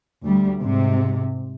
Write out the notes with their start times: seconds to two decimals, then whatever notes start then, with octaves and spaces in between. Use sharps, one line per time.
0.23 D2 G3
0.61 G#2 C3